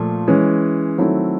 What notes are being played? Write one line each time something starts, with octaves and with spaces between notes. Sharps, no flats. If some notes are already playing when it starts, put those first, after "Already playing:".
Already playing: A#2 F3 A3
E3 G#3 C#4
D#3 F#3 A3 C4 E4